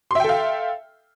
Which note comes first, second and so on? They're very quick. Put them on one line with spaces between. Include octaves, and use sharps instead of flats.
C6 E5 G5 A4 F5